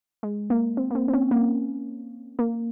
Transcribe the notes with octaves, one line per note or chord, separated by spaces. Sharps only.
G#3
A#3
C4
A#3
C4
C4
C#4
A#3
A#3